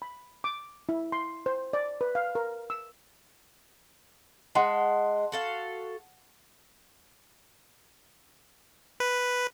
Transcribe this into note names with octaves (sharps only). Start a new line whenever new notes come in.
B5
D6
E4
C6
C5
D5
B4
F5
A#4
E6
G#3 F#5 A5 C6
F#4 A4 F5
B4